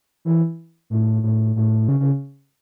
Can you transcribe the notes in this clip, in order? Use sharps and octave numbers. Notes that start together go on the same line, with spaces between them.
E3
A2
A2
A2
C#3
C#3